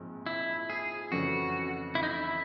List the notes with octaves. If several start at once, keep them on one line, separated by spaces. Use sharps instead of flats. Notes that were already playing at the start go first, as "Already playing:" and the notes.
Already playing: A#1 G#2 F3 G#3 C4
E4
G#4
F2 C#3 E3 A3 C#4 F#4
E4
D#4
E4